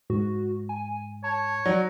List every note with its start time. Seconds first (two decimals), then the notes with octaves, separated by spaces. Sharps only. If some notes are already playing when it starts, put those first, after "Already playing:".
0.10 G#2 F#4
0.69 G#5
1.24 C#5 A5
1.66 F#3 D5